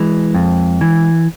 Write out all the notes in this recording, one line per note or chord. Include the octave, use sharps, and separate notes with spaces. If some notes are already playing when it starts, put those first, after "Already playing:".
Already playing: E3 G#3
F2
E3